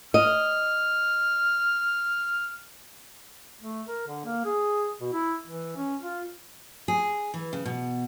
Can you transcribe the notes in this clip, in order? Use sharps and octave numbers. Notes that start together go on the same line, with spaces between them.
D#5 F6
A3
A#4
D3
A#3
G#4
B2
E4
E3
C#4
F4
G#4
E3
C#3
B2